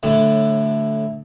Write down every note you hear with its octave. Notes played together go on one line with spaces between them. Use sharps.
A2 D3 F#3